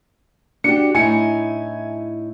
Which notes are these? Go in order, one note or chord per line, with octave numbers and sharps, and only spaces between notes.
D4 F#4 G4 C#7
A2 D#4 E4 G#5 C#7